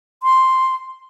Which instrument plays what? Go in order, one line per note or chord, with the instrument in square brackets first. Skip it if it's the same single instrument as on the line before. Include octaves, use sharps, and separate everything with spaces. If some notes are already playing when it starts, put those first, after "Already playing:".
[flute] C6